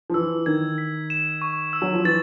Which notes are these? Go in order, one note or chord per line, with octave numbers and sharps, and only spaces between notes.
F3
E3 E6
D#3 G#6
B6
E7
C#6
E6
F#3
F3
E3 A6